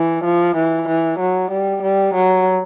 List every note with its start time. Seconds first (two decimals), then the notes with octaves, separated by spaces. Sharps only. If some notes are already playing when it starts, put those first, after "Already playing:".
Already playing: E3
0.25 F3
0.57 E3
0.89 E3
1.20 F#3
1.51 G3
1.83 G3
2.14 F#3